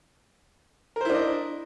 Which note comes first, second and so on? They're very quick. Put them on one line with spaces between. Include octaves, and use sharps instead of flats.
A#4 C5 E4 D4 D#5